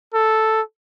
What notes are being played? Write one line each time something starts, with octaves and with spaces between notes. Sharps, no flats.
A4